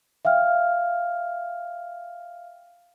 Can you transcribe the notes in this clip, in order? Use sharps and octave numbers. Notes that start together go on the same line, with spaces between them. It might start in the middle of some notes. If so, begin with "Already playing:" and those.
E5 F5 G5 F6